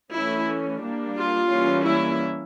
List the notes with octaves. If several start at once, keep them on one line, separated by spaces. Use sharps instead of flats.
E3 A3 C#4 E4
G3 A#3 D4
F4
E3 G3 A#3 C#4
E4